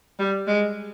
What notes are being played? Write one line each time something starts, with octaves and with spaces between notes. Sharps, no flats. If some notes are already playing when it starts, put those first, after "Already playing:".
G3
G#3